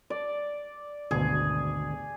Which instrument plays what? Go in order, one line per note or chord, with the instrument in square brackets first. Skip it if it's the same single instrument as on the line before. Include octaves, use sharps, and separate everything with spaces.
[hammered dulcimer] D5
[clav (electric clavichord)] G#1 D2 B2 [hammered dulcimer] G#4